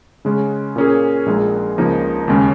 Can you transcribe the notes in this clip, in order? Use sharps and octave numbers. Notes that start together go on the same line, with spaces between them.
C#3 G#3 C#4
A#2 A#3 C#4 G#4
A#1 A#2 G#3 D#4 G#4
C#2 C#3 F3 A#3 D#4
D#2 C#3 G#3 C#4